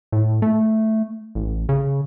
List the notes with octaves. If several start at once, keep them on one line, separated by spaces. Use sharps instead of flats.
A2
A3
A1
C#3